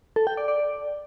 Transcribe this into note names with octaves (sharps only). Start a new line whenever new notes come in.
A4
G5
D5
D5